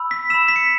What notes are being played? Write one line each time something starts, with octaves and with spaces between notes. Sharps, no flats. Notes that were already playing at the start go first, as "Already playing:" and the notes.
Already playing: B5 E6
B6
B5 E6 E7
B6
C#7